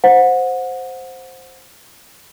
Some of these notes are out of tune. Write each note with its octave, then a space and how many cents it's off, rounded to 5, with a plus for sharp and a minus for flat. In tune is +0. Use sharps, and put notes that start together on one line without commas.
C5 +0 F#5 -25